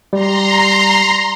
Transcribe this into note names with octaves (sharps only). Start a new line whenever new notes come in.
G3 A#5 C6